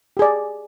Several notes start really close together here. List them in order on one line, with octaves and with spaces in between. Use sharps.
G4 G#4 D5